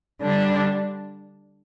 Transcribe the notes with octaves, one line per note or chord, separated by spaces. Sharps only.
D3 G3 D4